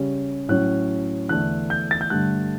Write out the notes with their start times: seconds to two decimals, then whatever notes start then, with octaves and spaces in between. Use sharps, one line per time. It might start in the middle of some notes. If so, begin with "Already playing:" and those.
Already playing: C#3 G3 C#4
0.49 A2 F#3 C#4 F#6
1.29 E2 D3 A3 D4 F#6
1.70 G6
1.91 A6
2.01 G6
2.10 G2 D3 A3 F#6